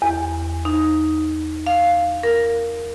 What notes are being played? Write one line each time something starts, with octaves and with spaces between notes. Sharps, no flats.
E2
D#4
F5
A#4